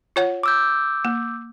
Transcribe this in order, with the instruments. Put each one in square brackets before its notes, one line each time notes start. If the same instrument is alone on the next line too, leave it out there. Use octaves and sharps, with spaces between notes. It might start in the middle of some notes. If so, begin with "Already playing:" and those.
[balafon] F4 C#5 F#5
[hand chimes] D6 E6 G6
[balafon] A#3